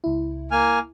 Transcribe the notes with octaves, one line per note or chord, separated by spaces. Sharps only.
C#2 E4
A#3 G#5 F6